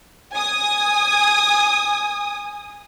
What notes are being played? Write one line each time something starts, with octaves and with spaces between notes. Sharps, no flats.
G#5 D#6